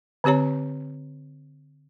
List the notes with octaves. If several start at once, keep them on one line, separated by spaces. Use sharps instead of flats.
D3 C4 G4 C#5 A#5